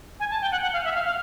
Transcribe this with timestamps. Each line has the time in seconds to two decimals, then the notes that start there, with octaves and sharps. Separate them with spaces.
0.20 G#5
0.30 A5
0.41 G5
0.52 F#5
0.62 F#5
0.73 F5
0.84 E5
0.95 F5
1.05 F5